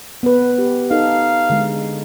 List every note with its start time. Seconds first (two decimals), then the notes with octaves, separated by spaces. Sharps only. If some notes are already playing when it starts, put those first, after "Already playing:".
0.23 B3 B4
0.58 G4
0.91 D#4 A4 F5
1.50 D3 G#3